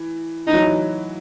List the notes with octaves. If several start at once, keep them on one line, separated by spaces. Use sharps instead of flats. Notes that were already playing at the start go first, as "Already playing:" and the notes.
Already playing: E3
E3 D#4
F#3
E3